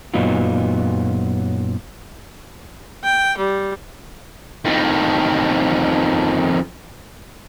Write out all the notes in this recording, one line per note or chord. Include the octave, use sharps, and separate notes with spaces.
F#2 A#2 F#3 B3 D#4 F4
G5
G3
F2 D#3